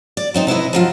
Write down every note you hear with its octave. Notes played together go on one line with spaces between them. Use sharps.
D5
F#3 C4 D#4
C3 E4 B4 D#5
F3 F#3 F4